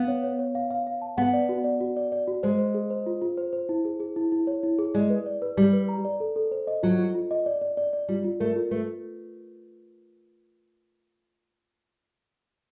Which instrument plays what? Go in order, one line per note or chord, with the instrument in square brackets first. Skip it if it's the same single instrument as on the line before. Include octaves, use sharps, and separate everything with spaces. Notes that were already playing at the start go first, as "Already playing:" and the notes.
Already playing: [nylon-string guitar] B3 [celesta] F5
[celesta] C#5
C#5
C#5
F5
F5
F5
A5
[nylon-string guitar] B3 [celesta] F#5
[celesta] D5
F#4
D5
F#4
D5
D5
F#4
[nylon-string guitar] G#3 [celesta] C5
[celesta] C5
G#4
C5
F4
F4
C5
C5
E4
G#4
G#4
E4
E4
C#5
E4
G#4
[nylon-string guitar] G#3 [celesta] D5
[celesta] B4
D5
B4
[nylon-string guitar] G3 [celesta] D5
[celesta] B4
A#5
D5
A4
A4
C5
D#5
[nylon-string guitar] F#3 [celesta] F4
[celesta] F4
F4
D#5
D5
D5
D5
D5
[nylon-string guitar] G3 [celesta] F4
[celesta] F4
[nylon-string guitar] A3 [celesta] A#4
[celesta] F4
[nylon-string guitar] A3 [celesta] B4